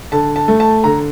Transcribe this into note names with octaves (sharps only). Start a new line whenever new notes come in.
D3 A5
A5
A3
A5
D3 A#5